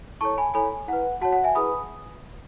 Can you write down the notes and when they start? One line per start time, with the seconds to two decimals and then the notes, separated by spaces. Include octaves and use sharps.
0.21 E4 A4 C#5 A5 C#6
0.38 G#5 B5
0.54 E4 A4 C#5 G#5 B5
0.88 E4 B4 F#5
1.21 F#4 C#5 F#5 A5
1.33 F#5
1.44 E5 G#5
1.55 E4 G#4 B4 B5 D#6